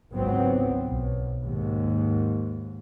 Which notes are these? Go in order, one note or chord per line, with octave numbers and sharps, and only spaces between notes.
G#1 C#2 F#3 B3 C4
B1
D#2 G#2